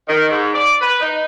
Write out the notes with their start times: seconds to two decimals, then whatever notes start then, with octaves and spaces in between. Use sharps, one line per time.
0.08 D#3
0.31 G#2
0.54 D5
0.81 B4
1.01 D#4